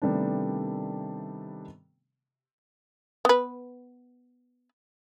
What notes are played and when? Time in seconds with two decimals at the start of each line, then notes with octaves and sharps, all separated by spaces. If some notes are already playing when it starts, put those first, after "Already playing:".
0.02 C3 D#3 G3 A3 B3 D4
3.25 B3 B4